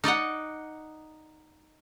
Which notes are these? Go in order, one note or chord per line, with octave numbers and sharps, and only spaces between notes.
D#4 D5 D#5 F#5